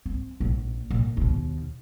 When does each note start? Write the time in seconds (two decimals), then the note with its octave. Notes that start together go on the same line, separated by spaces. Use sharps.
0.06 C4
0.40 A#1
0.91 A#2
1.17 D#2 B2